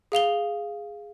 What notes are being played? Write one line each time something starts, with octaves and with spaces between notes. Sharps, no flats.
G#4 F5 F7 G7